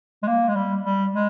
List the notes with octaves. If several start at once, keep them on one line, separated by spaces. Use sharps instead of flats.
G#3
A#3
G#3
G3
G3
G#3